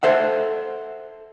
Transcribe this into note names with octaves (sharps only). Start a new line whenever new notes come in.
A4 C5 E5 F#5